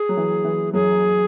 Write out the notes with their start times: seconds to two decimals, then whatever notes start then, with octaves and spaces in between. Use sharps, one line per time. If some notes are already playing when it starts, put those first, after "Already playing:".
Already playing: G#4
0.09 F#3
0.17 E3
0.45 E3
0.73 F#2 F#3 G#4